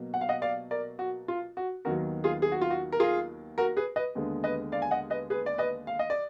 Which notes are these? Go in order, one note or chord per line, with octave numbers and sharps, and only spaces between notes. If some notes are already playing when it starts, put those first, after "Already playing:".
Already playing: B2 F#3 A#3
F#5
F5
D#5 F#5
D5 F5
A#4 D5
F#4
F4
F#4
D#2 D#3 F#3 B3 F#4 A#4
F4 G#4
G#4
F#4
F4
F#4
A#4
F4 G#4
F#4 A#4
G#4 B4
B4 D#5
D#2 D3 G#3 B3
B4 D#5
D5 F5
G#5
D#5 F#5
B4 D#5
G#4 B4
D5
B4 D#5
F5
D#5
D5